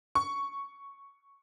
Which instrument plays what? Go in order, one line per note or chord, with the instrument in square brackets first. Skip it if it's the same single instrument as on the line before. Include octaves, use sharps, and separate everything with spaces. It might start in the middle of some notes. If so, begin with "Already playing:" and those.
[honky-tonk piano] C#6